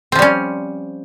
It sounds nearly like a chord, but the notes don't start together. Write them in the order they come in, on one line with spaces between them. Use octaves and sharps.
C4 F3 G3 C#4